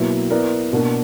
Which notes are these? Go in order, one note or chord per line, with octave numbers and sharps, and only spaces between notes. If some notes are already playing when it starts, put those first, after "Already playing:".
Already playing: B2 F#3 A#3 E4 B4
B3 E4 A#4 D5
B2 A#3 D4 A#4